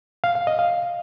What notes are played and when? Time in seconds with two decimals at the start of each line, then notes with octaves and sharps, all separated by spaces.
0.24 F5
0.35 F5
0.47 D#5
0.59 F5